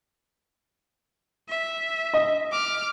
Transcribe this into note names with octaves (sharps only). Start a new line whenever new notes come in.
E5
D#5
D6 F6